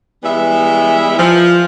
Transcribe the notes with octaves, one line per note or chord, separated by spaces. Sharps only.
E3 G3 G#3 B3 E5
F3